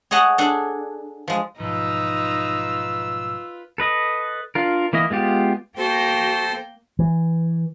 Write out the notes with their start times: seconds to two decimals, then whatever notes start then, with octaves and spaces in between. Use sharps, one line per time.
0.11 G#4 C#5 D#5 F#5 A5
0.38 D4 G#4 A4
1.28 F3 G#3
1.59 B1 G#2 F3 D#4 F4 B4 E6
3.78 A4 B4 D#5
4.55 D4 F4 A#4
4.93 E3 A#3 E4 D#5
5.10 G#3 B3 F4 G4
5.78 A#3 F#4 A4 C5 G5
6.99 E3